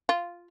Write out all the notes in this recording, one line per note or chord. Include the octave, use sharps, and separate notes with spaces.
F4